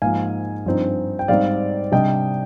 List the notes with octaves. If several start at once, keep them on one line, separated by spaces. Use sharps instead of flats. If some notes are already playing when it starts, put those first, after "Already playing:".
G#2 F3 A#3 F5 G#5
G2 F3 C4 D#4
G5
G#2 G3 C4 D#4 D5 F5
C3 G3 D4 D#5 G5